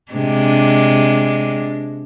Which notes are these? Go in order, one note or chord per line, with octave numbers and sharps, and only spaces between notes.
C3 G#3 D4